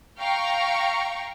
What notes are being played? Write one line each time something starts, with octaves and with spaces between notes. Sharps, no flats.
F5 G5 A#5 C#6